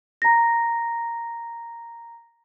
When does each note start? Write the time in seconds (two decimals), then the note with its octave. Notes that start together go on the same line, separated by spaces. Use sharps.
0.22 A#5 A#6